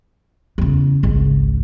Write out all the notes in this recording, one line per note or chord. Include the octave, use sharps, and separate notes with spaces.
E2 C#3
G#1 C#2